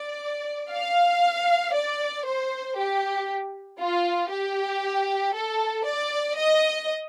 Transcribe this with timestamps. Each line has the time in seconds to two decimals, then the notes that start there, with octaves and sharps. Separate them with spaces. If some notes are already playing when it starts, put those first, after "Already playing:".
Already playing: D5
0.71 F5
1.74 D5
2.25 C5
2.77 G4
3.80 F4
4.31 G4
5.34 A4
5.85 D5
6.37 D#5